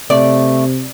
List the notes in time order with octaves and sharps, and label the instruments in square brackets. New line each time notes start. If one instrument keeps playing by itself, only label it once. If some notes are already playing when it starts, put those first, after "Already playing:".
[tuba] C3 [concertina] A3 [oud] D5